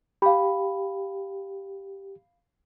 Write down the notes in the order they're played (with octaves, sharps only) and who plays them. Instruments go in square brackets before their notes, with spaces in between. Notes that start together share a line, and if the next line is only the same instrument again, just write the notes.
[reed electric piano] G4 [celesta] F5 B5